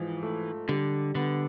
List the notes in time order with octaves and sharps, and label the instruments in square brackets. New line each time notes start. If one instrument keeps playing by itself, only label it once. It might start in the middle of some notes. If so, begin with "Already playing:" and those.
Already playing: [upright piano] G#2 F3 [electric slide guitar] E3
[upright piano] A3
[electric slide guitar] D3 [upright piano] G3
[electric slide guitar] D3 [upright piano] B3